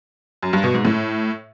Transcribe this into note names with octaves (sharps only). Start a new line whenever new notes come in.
F#2
G2
B2
G#2
A2